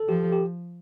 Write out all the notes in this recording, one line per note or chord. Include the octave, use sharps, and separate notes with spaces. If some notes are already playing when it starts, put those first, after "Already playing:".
Already playing: A4
F3 G4
G4